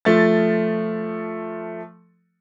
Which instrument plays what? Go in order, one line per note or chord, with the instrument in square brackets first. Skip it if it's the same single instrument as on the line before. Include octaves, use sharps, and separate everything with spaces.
[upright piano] F3 A3 A6